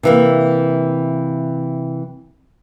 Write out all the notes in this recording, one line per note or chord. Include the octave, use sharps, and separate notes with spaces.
C3 E3 A#3